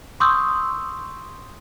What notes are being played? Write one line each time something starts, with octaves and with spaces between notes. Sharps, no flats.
C6 C#6 D#6 E6 G6